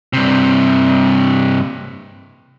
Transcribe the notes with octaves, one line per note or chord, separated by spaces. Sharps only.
G2 C3